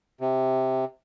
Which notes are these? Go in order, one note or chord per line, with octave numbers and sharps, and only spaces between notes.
C3